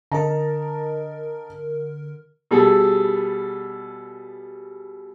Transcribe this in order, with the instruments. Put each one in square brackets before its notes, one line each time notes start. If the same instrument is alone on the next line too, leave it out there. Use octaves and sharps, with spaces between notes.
[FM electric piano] D3 A#4 [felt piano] D#5 A5 A#5
[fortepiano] B2 G3 G#4 A4